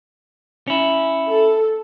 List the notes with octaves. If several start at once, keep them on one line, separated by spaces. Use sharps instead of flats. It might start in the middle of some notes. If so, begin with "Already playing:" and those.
C#4 E4
A4